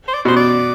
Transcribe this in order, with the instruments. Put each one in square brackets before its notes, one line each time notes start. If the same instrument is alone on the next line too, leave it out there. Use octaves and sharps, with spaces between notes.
[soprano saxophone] C5
D5
[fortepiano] B2 [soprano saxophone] C5
[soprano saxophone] D5